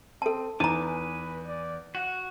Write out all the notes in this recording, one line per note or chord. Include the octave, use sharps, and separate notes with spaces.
C4 A4 A5
E2 D#4 B4 G#5 A#5 D6
D5
F#4 F#5